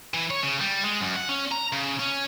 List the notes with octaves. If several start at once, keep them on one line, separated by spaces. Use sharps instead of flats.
E3
C#5
C#3
G3
G#3
F#2
F#5
C#4
A#5
C#3
C#4